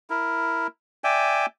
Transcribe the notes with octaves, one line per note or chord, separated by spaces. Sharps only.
E4 A#4
D5 E5 G5 G#5